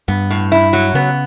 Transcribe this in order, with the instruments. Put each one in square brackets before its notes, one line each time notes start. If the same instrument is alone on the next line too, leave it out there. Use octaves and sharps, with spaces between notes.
[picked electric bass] G2 [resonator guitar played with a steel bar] B3
[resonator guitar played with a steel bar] A2
E4
F#3
[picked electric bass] C#3 [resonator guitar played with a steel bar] B3